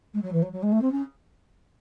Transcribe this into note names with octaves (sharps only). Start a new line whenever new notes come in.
G#3
F#3
E3
F#3
F#3
G#3
A3
C4
C#4